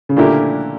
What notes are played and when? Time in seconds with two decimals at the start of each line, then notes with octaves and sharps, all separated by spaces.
0.09 C#3
0.17 A#2 D3 A3 E4 G4 A#4